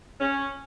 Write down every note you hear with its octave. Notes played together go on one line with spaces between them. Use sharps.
C#4